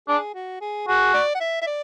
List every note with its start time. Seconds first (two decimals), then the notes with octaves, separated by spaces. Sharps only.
0.08 D4 G#4
0.35 F#4
0.61 G#4
0.88 F#4 G#4
1.14 D5
1.35 F#5
1.40 E5
1.62 E5
1.67 D5